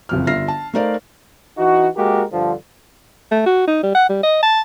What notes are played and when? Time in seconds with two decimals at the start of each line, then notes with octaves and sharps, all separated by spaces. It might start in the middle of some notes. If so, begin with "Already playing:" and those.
0.09 F#1 F2 F6
0.27 G1 F4 E5 F6 A#6 C7
0.48 A5
0.74 A3 D#4 A#4 C5 D5 F5
1.58 E3 D#4 F#4
1.96 G#3 A#3 F#4 G4 A#4
2.32 G2 D3 F3
3.31 A3
3.46 F#4
3.67 D#4
3.83 G3
3.95 F#5
4.09 G3
4.23 D#5
4.43 A5